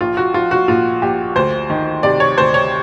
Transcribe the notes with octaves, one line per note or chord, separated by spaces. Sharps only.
A#1 F4
F#4
F3 F4
F#4
A#2 F4
A#1 G4
D2 C5
D#3
C3 D5
C#5
D2 C5
C#5